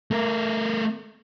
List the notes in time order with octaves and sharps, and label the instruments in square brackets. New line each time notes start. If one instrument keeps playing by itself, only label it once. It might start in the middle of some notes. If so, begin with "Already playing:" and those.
[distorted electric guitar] A3 A#4